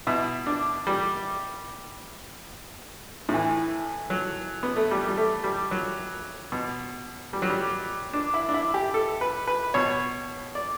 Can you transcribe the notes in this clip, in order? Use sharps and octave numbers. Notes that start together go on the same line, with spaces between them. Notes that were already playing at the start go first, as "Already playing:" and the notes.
B2 E4
D4
G3
A2
E3
F#3
B3
A3
G3
G3
A3
G3
F#3
B2
G3
F#3
G3
D4
E4
D4
E4
G4
A4
B4
B4
B2 C#5
D5